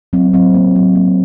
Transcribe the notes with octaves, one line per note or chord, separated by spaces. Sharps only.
F#3 C4
F#3 C4
A#3
F#3
A#3